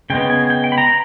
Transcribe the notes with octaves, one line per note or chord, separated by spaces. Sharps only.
C#3 G#3 B3 G5
G#5
G5
G5
B5
A#5